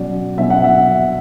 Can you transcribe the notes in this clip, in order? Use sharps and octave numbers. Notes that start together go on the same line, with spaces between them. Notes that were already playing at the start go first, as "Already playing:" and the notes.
Already playing: B2 F#3 C#4 D5
B2 F#3 C#4 E5
F#5
E5